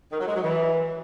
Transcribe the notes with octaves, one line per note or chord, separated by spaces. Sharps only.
D#3
F#3
G#3
F#3
E3